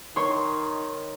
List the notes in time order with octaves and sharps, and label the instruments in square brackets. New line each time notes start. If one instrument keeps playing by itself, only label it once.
[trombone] D#3 [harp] C#5 C6